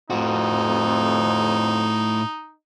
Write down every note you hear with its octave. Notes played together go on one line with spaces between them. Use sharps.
F2 A2 D#4 F#4